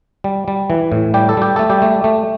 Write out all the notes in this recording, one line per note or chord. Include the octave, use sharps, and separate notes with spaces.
G3
G3
E3
A2
G3 G4
A4
G3 G4
A3 A4
G3 G4
A3
A3